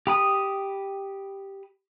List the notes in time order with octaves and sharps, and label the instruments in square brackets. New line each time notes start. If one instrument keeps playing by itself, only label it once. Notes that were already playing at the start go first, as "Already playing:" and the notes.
[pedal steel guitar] G4 B5 D#6